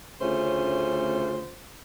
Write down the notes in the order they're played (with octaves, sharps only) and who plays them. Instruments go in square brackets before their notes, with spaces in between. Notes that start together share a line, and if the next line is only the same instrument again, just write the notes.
[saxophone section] D2 C#3 A3 C#4 F4 C5